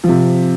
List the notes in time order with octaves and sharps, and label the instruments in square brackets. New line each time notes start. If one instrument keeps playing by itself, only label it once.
[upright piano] C3 F3